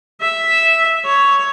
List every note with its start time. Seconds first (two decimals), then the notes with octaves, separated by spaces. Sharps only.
0.21 E5
1.05 C#5